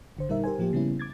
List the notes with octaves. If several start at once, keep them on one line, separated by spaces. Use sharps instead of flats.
G#1 D3 C5
A#2 G3 D#4 A#4 E5
G4 A#4 C5 G#5
A2 F3 A#3 G4
C#3 G3 B3 C#4 E4
D6 G#6 A6